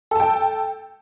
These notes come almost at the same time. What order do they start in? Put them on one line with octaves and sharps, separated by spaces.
A4 A5 G5